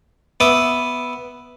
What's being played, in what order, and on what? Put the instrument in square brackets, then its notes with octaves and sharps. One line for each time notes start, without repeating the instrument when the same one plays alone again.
[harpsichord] B3 E5 D6 D#6